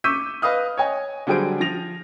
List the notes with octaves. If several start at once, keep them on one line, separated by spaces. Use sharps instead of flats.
C#6 D6 E6 G6 B6 D#7
B4 D#5 F5 D#6 F6
C#5 D#5 G#5
D3 F#3 G3 G#4 C5 D7
F3 A#6 F7